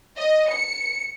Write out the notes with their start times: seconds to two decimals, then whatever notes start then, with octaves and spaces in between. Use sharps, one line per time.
0.16 D#5
0.49 C#7